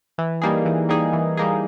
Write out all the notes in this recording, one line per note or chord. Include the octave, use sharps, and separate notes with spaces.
E3
G3 A#3 D#4 G#4
E3
G3 A#3 D#4 G#4
E3
G3 A#3 D#4 G#4